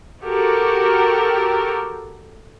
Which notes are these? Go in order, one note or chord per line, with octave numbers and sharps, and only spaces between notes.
F#4 G4 A4 A#4